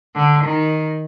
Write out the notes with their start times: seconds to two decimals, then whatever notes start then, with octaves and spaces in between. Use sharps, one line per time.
0.15 D3
0.44 D#3